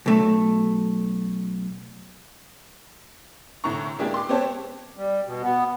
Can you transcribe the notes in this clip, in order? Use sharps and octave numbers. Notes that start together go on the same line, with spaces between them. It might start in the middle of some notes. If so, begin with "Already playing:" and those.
B1 A3
C2 A2 D3 A#5 C#6
G#3 A#3 D4 E4 G4 G#4
C6 D6
B3 C4 G4 C5 C#5 A5
G3
B2
B3